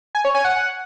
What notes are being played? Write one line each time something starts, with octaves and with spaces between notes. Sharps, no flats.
G#5
C#5
G#5
F#5